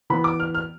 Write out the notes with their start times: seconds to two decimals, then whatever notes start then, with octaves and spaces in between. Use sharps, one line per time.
0.10 E3 B3 B5
0.24 D6
0.40 F6
0.55 F6